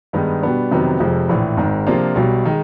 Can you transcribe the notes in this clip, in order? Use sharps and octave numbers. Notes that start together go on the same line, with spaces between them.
G2 D#3 G#3 B3 D#4
B2 G3 B3 D4
F2 C3 D#3 F#3 B3
F1 F2 C3 F3 G#3
A#1 A2 E3
G#1 G#2 D#3
C3 F3 A#3 D4 F4
B1 B2 G3
D#3 G#3